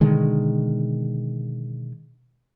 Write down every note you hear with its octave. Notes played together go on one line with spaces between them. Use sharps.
B2 D3 D#3 G#3